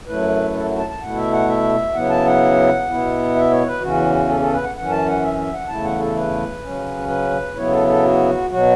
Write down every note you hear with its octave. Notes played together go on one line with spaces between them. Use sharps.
F#2 F#3 A3 E4 B4
A4
F#4
A5
A5
B2 A3 E4 F#5
E5
F#5
E5
C#3 F#3 B3 E4 F#5
A5
F#5
B2 B3 E4
E5
C#5
B4
E2 C#3 E3 C#4 F#4
A4
A4
B4
F#5
F#2 E3 C#4 F#5
A5
F#5
E5
E5
F#5
E2 C#3 A3 E4 A5
F#5
A4
B4
C#3 F#3 C#4
B4
C#3 F#3 B3 E4 C#5
A4
A4
F#4
B2 F#3 F#4